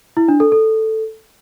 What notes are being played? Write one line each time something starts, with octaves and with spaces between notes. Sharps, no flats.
E4
D4
A4
A4